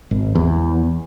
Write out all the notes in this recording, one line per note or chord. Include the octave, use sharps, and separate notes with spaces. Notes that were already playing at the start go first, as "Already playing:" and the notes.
G#1
E2